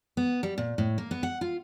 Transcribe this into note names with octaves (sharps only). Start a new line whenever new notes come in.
B3
G3
A#2
A2
A#3
B3
F#5
F4